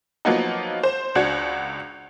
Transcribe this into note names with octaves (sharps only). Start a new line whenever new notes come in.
F3 F#3 A#3 B3 D#4
C5
C#2 D4 F#4 G#6